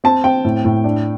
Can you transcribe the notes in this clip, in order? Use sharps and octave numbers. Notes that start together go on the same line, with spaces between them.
C4 A5
C4 G5
A2
A2
D4